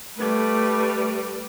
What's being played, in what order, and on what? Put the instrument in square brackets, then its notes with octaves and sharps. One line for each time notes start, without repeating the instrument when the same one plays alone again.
[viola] G3 B4 [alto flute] A3